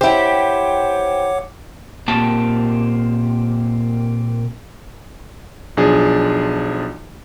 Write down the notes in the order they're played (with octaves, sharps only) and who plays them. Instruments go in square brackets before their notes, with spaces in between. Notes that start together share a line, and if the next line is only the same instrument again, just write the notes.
[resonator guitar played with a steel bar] E4 G4 [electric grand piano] C5 G5 [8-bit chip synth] C#5 F#5 D6
[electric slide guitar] A#2 A#3 C4 G4 A5
[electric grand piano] B1 F3 D4 G#4